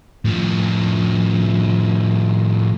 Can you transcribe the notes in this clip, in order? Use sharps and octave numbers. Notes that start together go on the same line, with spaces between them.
A2 F3